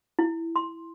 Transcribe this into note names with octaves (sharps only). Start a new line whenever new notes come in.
E4
C6